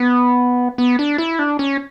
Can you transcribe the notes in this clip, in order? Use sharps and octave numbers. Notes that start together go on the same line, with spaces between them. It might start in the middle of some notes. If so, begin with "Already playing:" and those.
Already playing: B3
B3
D4
E4
D4
C#4